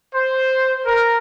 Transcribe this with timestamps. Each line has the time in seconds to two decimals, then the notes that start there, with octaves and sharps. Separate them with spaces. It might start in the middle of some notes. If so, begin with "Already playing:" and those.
0.14 C5
0.85 A#4